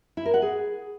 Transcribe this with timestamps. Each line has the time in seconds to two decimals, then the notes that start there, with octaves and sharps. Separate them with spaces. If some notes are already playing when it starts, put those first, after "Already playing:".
0.17 E4
0.25 A#4
0.34 F#5
0.42 G#4